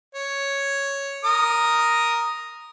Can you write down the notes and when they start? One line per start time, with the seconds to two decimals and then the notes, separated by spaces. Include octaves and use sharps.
0.15 C#5
1.25 A#4 D#6